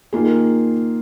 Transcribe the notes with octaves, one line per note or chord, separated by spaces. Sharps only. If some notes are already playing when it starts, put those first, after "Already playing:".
D#3 A#3 F4 G#4